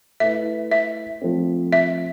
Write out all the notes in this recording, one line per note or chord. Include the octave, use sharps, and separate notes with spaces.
A3 E4 B4 E5
E5
F3 A3 C4
E5